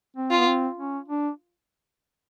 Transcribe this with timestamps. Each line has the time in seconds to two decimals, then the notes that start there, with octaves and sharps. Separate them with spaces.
0.16 C4
0.31 F4
0.38 B3
0.47 C4
0.77 C#4
1.08 D4